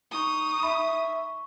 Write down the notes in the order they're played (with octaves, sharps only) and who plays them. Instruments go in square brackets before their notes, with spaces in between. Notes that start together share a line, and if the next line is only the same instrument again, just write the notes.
[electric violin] D#4 D#6 [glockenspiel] C#6 G7
[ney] E5 [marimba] B5